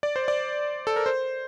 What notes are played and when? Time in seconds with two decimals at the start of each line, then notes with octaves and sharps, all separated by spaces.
0.03 D5
0.16 C5
0.28 D5
0.87 A4
0.96 A#4
1.06 C5